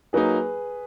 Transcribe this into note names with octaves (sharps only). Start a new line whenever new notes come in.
F#3 A#3 D#4 G#4 B4